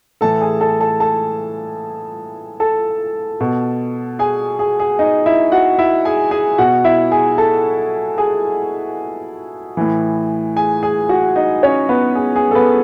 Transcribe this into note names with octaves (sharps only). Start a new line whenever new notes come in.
A2 E3 A4 A5
G#4 G#5
A4 A5
A4 A5
A4 A5
A4 A5
B2
G#4 G#5
G#4
G#4
D#4 D#5
E4 E5
F#4 F#5
E4 E5
G#4 G#5
G#4 G#5
B2 F#4 F#5
E4 E5
G#4 G#5
A4 A5
G#4 G#5
A2 E3
G#4 G#5
G#4 G#5
F#4 F#5
D#4 D#5
C#4 C#5
B3 B4
G#4
G#4
A4
B3 B4